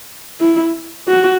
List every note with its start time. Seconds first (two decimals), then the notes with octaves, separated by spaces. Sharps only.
0.40 E4
1.08 F#4